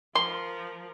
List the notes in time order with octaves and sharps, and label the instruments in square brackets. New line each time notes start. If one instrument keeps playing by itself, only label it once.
[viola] F3 A#4 [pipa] C6